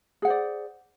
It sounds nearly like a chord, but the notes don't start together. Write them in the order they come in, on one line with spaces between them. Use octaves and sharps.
G#4 F#5 C5 D5